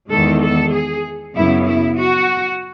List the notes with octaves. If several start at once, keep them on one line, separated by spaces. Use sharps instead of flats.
E2 D#3 G#3 A4
A4
G#4
F#2 C#3 F#3 B3 E4
E4
F#4